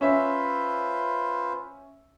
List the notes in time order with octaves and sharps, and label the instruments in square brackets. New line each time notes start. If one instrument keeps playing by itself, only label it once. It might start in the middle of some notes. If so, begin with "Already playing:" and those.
[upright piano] C#4 E5 [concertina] F4 B4 C5